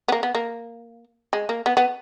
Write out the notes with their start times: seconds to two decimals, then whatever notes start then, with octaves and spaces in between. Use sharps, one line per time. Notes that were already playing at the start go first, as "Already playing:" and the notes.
0.08 B3
0.12 A#3
0.23 B3
0.35 A#3
1.33 G#3
1.49 A#3
1.66 B3
1.77 B3